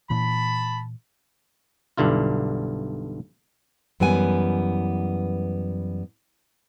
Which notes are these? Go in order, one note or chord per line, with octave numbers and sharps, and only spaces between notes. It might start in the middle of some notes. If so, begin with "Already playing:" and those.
A#2 E3 A5 B5
B1 G2 D3 E4 F4
F#2 E3 G3 B3 G#5